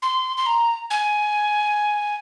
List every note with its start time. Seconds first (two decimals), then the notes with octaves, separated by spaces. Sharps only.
0.02 C6
0.37 C6
0.46 A#5
0.91 G#5